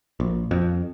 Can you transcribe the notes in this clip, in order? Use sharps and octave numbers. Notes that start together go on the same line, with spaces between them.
A#1
F2